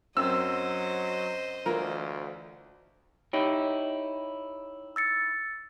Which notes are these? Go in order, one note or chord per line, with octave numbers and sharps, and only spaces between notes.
F#2 F#3 C4 C5 D#5 E6
D2 E3 F4 A#4
D#4 E4 G4 C#5
E6 A6 C#7